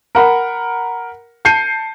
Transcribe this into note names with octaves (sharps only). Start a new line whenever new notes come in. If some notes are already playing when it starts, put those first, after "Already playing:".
A#4 F#5 B5
A5 G6 C7 C#7 D#7